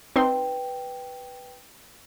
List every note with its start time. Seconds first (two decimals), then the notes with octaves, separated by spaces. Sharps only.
0.16 C4 D#4 B4 G5 C6